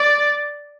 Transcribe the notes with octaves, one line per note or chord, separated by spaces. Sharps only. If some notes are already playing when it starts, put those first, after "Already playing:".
Already playing: D5